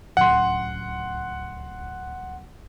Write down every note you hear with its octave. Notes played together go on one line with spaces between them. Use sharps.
D1 C#2 F#5 C6